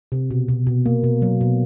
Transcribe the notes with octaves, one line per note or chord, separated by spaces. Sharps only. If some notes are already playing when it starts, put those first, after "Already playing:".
C3
B2
B2
B2
A#3
B2
F#3
B2